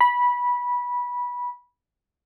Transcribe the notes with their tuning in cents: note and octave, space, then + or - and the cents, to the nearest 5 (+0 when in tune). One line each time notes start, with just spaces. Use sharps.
B5 -15